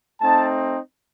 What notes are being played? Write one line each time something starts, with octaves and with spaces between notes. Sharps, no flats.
A3 C4 D#4 A5